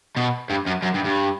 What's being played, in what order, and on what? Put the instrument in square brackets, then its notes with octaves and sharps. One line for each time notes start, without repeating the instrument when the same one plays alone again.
[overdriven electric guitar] B2
G2
F#2
F#2
G2
G2